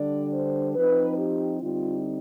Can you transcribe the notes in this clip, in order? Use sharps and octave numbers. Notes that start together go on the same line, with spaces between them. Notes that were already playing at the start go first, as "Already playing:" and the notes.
Already playing: D3 G3 D4 D5
C5
F3 C4 D#4 B4
G4
D3 G3 C4 D#4 F4